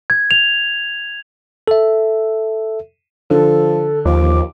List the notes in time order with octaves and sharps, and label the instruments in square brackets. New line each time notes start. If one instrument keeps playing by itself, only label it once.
[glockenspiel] G#6
F7
[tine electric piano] A4 E5
[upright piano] D3 [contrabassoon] F3 [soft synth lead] A4
[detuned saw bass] D#2 [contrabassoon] F3 [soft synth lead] D6